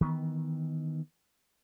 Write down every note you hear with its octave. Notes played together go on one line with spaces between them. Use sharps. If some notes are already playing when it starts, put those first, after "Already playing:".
D#3 E3 G#3 B3